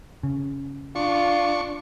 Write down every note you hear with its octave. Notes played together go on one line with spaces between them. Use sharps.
C#3
D4 F4 C#6